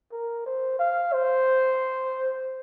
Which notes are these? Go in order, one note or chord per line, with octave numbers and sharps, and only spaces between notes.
A#4
C5
F5
C5